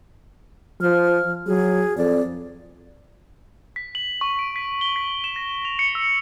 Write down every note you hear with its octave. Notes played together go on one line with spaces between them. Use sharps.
F3 F6
F#3 G#4
F2 D5
B6
F#7
C#6
D7
B6
G7
B6
E7
A#6
F7
C#7
E6